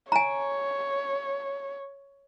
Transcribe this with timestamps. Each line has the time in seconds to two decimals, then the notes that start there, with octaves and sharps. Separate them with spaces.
0.12 C#5 G#5 A#5